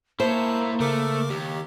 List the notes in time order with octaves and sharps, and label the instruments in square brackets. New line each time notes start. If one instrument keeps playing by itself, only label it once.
[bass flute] A#3 [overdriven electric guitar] E4 C#5 [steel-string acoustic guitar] C5 [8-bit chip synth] A5
[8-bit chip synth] C#3 A#4 D6 [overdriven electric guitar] A3
[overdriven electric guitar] D#2 [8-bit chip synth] G4